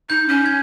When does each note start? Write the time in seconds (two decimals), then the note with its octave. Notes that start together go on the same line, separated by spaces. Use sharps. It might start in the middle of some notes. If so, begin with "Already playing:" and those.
0.09 D#4 G6
0.28 C#4
0.46 G#6